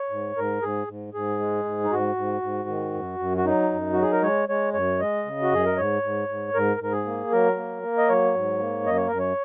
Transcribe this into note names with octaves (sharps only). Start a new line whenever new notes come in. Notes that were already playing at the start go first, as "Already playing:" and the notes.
Already playing: C#5
G#2
G#2 A#4
G#2 G#4
G#2
G#2 G#4
G#3
G#2
D#4
G#2 F#4
G#2
G#2
D#3
F#2
F#2
F#4
F#3 D#4
F#2
F#3 F#4
G#4
A#4
G#3 C#5
G#3 C#5
F#2 C#5
G#3 D#5
C#3
F#4
F#2 G#4
A#4
G#2 C#5
G#2
G#2
G#2 A#4
G#2 A#4
G#4
A#3
F#3 A#4
A#3
A#3
D#5
F#3 C#5
G#2
A#3
F#2 D#5
C#5
F#2 A#4
C#5